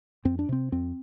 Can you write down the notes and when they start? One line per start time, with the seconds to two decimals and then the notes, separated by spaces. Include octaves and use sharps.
0.25 F2 C4
0.39 D4
0.49 C3 C4
0.72 F2 C4